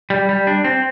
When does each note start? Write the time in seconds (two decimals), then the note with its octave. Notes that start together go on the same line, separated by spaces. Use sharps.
0.10 G3
0.29 G3
0.47 D4
0.64 C4